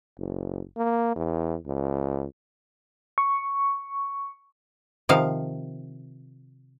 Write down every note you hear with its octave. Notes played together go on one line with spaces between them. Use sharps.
F#1
A#3
E2
C#2
C#6
C3 D#3 F3 F5